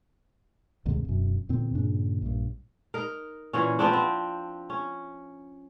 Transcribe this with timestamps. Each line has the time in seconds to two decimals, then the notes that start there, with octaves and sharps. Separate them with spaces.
0.85 D2 G#2 C3 D#3
1.05 E1 F#2
1.49 E2 A#2 D3 C4
1.74 G2 A#2 C#3 D4
2.22 A#1 G2
2.94 D#4 A#4
3.53 A#2 E3 C#4
3.79 F3 B3 C4 D4
3.93 C4
4.70 C#4